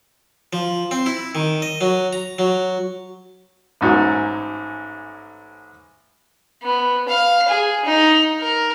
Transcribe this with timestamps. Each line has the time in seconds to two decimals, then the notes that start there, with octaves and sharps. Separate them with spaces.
0.53 F3
0.91 C4
1.06 E4
1.35 D#3
1.62 D#5
1.81 F#3
2.13 A#5
2.39 F#3
3.81 A1 G#2 F#3 G#5
6.63 B3
7.08 F5
7.48 G#4
7.85 D#4
8.40 A#4